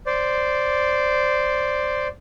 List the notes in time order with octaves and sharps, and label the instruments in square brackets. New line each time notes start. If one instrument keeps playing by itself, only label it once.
[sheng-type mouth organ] C5 D5